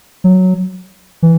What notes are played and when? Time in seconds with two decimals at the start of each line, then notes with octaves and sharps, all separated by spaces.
0.24 F#3
1.23 E3